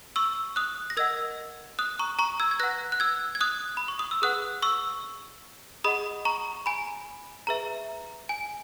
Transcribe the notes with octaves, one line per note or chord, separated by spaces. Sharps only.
C#6 E6
D#6 F#6
A#6
A#4 D#5 F#5 E6 G#6
D#6 F#6
A#5 C#6
A#5 C#6
E6 G#6
G#6
B4 F#5 F#6 A#6
F#6
E6 G#6
G#6
D#6 F#6
B5
C#6
D#6
E6
G#4 B4 F#5 D#6 F#6
C#6 E6
G#4 D#5 F#5 B5 D#6
A#5 C#6
G#5 B5
G#4 B4 E5 A#5
G#5